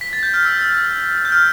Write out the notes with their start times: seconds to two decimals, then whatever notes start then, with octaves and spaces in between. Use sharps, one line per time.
0.01 B6
0.13 A6
0.23 G6
0.34 F6
0.45 E6
0.59 E6
1.25 G6
1.32 F6